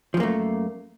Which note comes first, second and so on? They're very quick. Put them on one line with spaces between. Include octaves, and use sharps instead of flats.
F3 F#2 A#3 A3